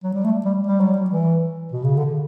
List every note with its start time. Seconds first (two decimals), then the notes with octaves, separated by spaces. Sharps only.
0.03 F#3
0.13 G3
0.24 A3
0.45 G3
0.67 G3
0.80 F#3
0.93 G3
1.10 E3
1.72 B2
1.84 C#3
1.97 D3